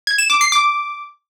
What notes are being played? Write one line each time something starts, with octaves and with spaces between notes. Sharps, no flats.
G#6
E7
D6
C7
D6